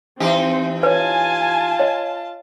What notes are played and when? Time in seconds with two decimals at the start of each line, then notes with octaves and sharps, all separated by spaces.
0.20 E3 C4 D#4 G4
0.83 F4 B4 C#5 G#5 A5
1.79 C#5 D#5